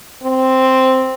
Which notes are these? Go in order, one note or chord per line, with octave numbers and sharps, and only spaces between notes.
C4